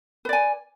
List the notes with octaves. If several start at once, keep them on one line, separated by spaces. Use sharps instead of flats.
B4 D5 G#5